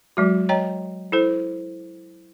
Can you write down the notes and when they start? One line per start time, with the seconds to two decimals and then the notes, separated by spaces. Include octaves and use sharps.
0.17 F#3 G#3 F#4
0.49 C#5 D#5 G5 A#5
1.12 E4 A4 C5